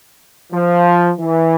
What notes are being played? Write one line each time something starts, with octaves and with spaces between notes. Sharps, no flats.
F3
E3